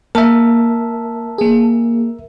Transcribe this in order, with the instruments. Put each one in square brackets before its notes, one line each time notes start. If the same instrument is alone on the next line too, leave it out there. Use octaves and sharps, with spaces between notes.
[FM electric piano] A#3 [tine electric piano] A#4 E5 [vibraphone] A5
[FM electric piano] A#3 G#4